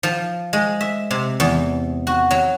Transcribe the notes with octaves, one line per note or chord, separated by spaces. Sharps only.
F3
G#3
E5
C3
E2
F#4
F#3